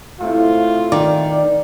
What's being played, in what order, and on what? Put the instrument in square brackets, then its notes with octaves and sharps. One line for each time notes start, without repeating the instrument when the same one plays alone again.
[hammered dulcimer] A2 C3 [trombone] F4
[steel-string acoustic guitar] D#3 [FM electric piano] D5